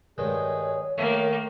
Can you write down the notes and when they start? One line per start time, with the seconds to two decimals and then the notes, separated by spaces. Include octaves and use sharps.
0.18 G2 D#3 G#3 G#4 C#5
0.98 D#3 A3 A#3 A#4